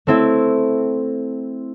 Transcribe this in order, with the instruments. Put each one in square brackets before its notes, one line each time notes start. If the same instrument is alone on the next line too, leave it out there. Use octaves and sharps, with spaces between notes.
[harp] A3 C4 E4